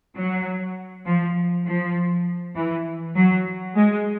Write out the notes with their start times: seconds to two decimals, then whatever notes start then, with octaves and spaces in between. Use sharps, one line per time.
0.16 F#3
1.06 F3
1.66 F3
2.55 E3
3.16 F#3
3.75 G#3